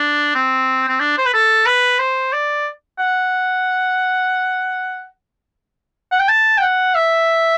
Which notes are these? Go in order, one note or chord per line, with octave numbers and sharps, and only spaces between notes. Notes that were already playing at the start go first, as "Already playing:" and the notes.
Already playing: D4
C4
C4
D4
C5
B4
A4
B4
C5
D5
F#5
F#5
G5
A5
G5
F#5
E5